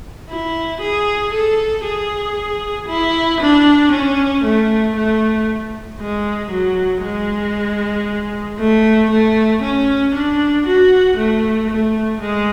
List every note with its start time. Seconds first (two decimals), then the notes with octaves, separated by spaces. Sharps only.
0.29 E4
0.81 G#4
1.33 A4
1.84 G#4
2.88 E4
3.40 D4
3.92 C#4
4.44 A3
4.95 A3
5.99 G#3
6.50 F#3
7.02 G#3
8.58 A3
9.10 A3
9.62 C#4
10.14 D4
10.66 F#4
11.17 A3
11.70 A3
12.21 G#3